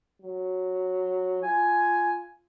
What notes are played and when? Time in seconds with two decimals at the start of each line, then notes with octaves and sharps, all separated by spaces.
0.21 F#3
1.43 F4 G#5